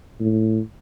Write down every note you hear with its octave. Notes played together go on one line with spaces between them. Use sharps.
A2